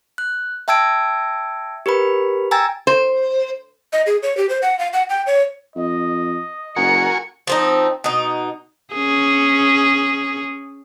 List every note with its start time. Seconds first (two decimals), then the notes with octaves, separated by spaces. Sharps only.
0.18 F#6
0.68 E5 G5 A5 E6 G#6 D7
1.86 G4 A#4 B4 B5
2.51 G5 G#5 A#5 E6 G#6 A6
2.87 C5
3.93 D#5
4.06 G#4
4.23 C#5
4.37 G4
4.49 C5
4.62 F#5
4.79 F5
4.93 F#5
5.09 G5
5.27 C#5
5.76 F2 D#5
6.77 F#1 F#4 A#4 G#5 C#7
7.47 F3 C4 D#4
8.04 B2 D#4
8.94 C#4 G#4